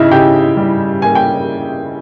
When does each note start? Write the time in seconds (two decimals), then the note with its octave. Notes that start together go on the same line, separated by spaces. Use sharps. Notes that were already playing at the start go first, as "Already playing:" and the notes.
Already playing: C#3 D#4 E4 D#5 E5
0.11 C#3 G4 G5
0.57 G3
1.02 A#3 G#5
1.15 G5